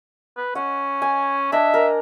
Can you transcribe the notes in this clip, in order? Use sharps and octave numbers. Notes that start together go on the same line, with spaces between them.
B4
C#4 F#5
G#5
D4 D#5 E5
A#4